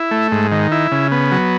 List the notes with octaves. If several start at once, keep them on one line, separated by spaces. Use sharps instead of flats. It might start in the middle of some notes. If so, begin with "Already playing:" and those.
Already playing: E4
A3
G#2
D#3
E4
C#3
B3
F#3